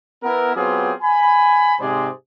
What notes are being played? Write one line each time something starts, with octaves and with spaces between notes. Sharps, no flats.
B3 E4 A#4
F#3 B3 C4 F4 G4 G#4
G#5 B5
G#2 C3 G#3 G#4 C5 D5